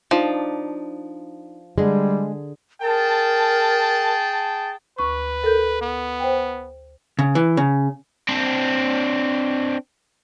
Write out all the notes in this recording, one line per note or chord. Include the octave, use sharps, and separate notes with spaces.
F3 D4 D#4 D6
D3 G3 G#3 G#4
G#4 A#4 G5 A5
D2 B4 C#6
A4 A#4 G6
B3
C5 G5
C#3
E3
C#3
C4 D4